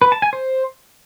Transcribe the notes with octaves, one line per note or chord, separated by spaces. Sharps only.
B4
A5
G#5
C5